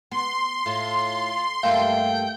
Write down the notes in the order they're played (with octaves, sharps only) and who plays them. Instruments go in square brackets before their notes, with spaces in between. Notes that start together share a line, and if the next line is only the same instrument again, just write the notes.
[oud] B3 [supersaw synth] C6
[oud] A2 [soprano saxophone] F4
[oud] G2 A3 A#3 [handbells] F5 [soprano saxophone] G5